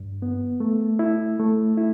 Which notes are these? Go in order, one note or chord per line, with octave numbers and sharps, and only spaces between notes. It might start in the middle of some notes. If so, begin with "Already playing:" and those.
Already playing: G2
B3
A3
E4
A3
E4